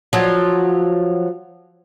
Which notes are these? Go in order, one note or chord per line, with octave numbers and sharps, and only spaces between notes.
F3 F#3